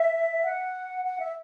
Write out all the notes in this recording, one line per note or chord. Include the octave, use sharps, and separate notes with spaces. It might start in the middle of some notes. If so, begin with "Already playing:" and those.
Already playing: E5
F#5
F#5
E5